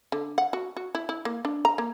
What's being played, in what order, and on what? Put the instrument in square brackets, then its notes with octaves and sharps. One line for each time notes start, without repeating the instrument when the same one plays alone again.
[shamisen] D3
F#5
F#4
F#4
E4
E4
A#3
D4
A#5
A#3